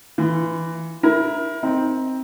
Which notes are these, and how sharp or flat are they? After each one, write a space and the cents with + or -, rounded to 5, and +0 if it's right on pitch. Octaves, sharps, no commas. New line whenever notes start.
E3 +0 F4 -15
E4 +0 A#4 +20
C4 +0 D#4 +10